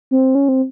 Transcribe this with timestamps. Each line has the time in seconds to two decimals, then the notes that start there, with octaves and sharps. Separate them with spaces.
0.11 C4
0.35 C#4
0.49 C4